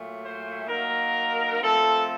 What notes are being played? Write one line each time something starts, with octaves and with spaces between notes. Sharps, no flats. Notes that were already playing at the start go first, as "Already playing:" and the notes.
Already playing: A#2 F#3 A3
C5
F#3 A#3 D#4 A#4
F3 A3 C4 A4